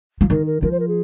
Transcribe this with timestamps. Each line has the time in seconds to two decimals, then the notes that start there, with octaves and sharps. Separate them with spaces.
0.21 F3
0.30 D#3 A#4
0.46 A#4
0.63 F3 A#4
0.71 C5
0.80 A#4
0.88 G#4